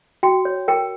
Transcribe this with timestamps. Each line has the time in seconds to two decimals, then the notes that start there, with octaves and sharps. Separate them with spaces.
0.23 F#4 G5
0.45 C#5
0.68 A#4 G5